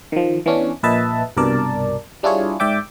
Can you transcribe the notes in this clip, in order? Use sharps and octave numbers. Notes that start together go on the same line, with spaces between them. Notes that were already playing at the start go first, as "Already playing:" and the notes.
D#3 F3
E3 B3 C#4 D4
A#1 A#2 B4 D#5 E5 A5
C2 G2 B2 A#4 D5 A5
G3 D4 E4 F4 G#4 C#5
G#2 D5 E5 G5 D6